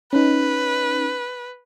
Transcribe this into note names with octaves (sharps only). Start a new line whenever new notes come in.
C#4 D#4 B4